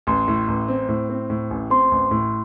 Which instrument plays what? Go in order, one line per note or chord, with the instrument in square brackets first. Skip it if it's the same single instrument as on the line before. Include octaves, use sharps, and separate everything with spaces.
[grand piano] A1 [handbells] C6
[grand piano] A2
A1
C4
A2
C4
A2
A1
[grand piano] C4 [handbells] C6
[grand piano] A1
A2